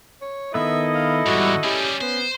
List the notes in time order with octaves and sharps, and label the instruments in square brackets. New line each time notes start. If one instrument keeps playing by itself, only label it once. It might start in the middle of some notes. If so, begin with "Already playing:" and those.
[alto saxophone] C#5
[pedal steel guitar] D#3 B3 B4 [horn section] E4 A4 D#5 [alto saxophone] E5
[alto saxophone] F5
[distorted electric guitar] E2 G#2 [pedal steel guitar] G3 [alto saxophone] F#4
[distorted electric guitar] G3 G#4 [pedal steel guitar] C#4 [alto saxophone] G4
[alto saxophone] B3 [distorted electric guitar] C5